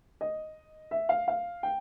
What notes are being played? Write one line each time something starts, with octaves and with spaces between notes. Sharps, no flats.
D#5
E5
F5
F5
G5